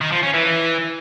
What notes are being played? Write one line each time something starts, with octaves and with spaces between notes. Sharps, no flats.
D#3
F3
C#4
E3